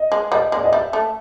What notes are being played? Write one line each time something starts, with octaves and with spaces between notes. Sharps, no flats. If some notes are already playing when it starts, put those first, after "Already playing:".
Already playing: D#5
G#3
G3 D#5
G#3
D5
D#5
G3 E5
A3